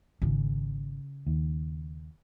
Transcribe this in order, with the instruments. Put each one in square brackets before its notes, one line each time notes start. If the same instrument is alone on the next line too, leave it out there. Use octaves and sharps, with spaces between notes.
[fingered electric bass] G#1 [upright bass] C#3
[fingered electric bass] D#2